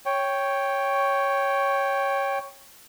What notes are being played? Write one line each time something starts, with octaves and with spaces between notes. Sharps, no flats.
C#5 G5